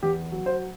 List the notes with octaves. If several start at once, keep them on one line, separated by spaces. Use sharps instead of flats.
E2 G4
F#3
C5